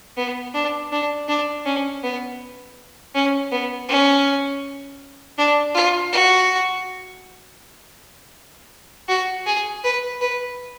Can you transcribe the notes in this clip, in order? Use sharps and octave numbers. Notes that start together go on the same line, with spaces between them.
B3
D4
D4
D4
C#4
B3
C#4
B3
C#4
D4
F4
F#4
F#4
G#4
B4
B4